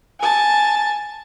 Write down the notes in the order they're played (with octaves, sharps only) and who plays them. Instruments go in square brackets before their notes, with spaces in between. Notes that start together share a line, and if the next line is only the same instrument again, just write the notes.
[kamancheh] G#5 A5